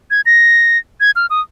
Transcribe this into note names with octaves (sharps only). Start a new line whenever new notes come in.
G#6
A#6
G#6
F6
D#6